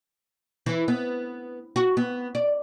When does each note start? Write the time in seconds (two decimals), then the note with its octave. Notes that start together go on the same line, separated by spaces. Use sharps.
0.66 E3
0.88 B3
1.76 F#4
1.97 B3
2.35 D5